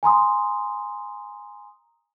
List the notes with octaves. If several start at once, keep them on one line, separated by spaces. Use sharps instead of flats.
G#5 A#5 C6 D#6